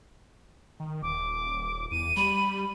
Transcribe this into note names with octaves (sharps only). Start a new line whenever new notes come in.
D#3
D#1 D6
E2 D#7
G3 B5